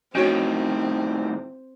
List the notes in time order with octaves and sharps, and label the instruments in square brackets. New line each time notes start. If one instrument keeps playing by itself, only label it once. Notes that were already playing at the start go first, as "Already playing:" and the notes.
[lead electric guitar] A2 D#3 [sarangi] C4 [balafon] C#4 F#4 C#5